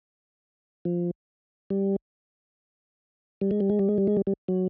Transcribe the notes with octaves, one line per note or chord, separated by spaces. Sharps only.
F3
G3
G3
G#3
G3
G#3
G3
G#3
G3
G#3
G3
G3
F#3